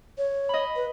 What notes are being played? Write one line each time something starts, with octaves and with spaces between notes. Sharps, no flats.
C#5
D#5 B5
B4